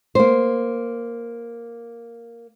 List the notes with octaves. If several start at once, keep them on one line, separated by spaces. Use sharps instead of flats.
A#3 C5